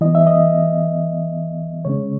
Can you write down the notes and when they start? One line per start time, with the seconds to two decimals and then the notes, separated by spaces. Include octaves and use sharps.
0.01 E3 B3 D#5
0.15 E5
0.27 D#5
1.85 C#3 G#3 C#4 C#5